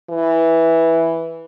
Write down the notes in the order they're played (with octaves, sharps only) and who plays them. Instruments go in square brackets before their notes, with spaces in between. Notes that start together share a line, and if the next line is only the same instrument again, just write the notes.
[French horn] E3